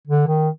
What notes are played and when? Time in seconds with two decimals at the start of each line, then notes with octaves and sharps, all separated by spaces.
0.07 D3
0.27 D#3